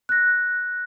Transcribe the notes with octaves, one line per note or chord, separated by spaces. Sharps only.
F#6 A#6